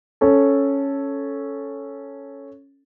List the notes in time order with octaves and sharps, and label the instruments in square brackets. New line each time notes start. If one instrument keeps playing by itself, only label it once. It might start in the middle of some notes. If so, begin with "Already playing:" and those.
[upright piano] C#4 A4